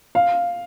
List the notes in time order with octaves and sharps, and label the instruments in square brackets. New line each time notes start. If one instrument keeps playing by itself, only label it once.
[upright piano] F5